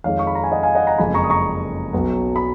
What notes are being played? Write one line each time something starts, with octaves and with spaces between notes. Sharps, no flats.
F2 D#3 G#3 C#5 F5
C#6
B5
A#5
G#5
D#5 F#5
F5 G#5
D#5 F#5
F#5 A#5
F#1 F2 F3 G#3 G#5 B5
A#5 C#6
D#6
A#5 C#6
B1 B2 F#3
B5